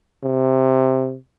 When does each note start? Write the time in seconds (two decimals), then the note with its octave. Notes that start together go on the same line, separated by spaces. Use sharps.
0.23 C3